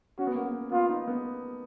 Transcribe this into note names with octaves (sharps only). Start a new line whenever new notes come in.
C#4 F#4
B3
A#3
B3
B3 F4
D#4
B3